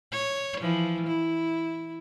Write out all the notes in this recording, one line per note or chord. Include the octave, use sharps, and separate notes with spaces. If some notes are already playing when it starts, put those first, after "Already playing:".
C#5
E3 F3
E4